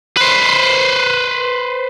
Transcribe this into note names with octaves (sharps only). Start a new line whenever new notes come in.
B4 C5